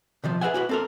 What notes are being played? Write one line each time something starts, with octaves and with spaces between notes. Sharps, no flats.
C3 D#3 F3
G#4 B4 D5 E5 F#5 G#5
E4 F#4 B4
C4 A4 A#4